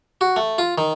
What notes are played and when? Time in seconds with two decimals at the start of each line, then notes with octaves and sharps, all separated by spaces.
0.21 F#4
0.36 A3
0.58 F4
0.78 D#3